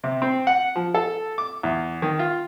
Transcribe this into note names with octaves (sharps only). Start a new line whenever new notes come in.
C3
C4
F#5
F3
A4
D6
E2
D#3
F4